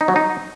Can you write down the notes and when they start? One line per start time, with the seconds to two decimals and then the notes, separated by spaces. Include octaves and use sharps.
0.01 D#4
0.08 F#3
0.16 D#4